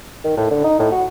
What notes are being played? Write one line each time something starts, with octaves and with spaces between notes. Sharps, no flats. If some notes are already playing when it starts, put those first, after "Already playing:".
D#3
A2
D3
D#4
A2
F#4